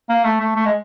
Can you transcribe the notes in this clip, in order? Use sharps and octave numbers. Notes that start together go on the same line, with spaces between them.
A#3
A3
A3
A3
G#3